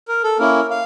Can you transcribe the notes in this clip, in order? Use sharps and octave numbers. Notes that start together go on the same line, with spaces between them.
A#4
A4
A#3 C#4 E4 A#4
F5